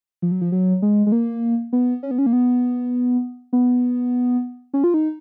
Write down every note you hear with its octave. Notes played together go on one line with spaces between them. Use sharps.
F3
F#3
F3
F#3
G#3
G#3
A#3
B3
C#4
B3
C#4
A#3
B3
B3
C#4
F4
D#4